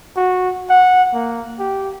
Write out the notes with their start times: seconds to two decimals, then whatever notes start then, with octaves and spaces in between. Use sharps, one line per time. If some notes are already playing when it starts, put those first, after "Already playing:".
0.16 F#4
0.69 F#5
1.13 A#3
1.59 G4